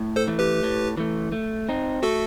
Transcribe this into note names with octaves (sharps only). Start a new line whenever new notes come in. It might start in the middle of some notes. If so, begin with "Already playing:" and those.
Already playing: A2
A4 C5
E3 A3
G4 B4
A2
E3 A3
A3
C4 D#4
A3 F#4 A4